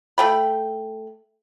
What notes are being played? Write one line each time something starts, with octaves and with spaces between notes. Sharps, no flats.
A3 G5 B5